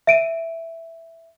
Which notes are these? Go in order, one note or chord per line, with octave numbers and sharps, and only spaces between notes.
E5 D7 D#7